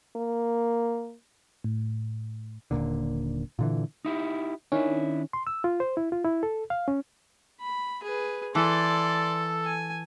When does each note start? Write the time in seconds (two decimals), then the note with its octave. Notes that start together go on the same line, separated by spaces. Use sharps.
0.17 A#3
1.64 A2
2.71 D#1 B1 A#2 D3
3.59 A#2 D3 E3
4.05 D#4 E4 G4
4.72 D#3 C#4 D4 E4
5.33 C6
5.47 E6
5.64 F4
5.80 C5
5.97 E4
6.12 F4
6.25 E4
6.43 A4
6.70 F5
6.88 C#4
7.61 B5
8.03 G#4 B4
8.55 E3 A4 D5 C6
9.65 G#5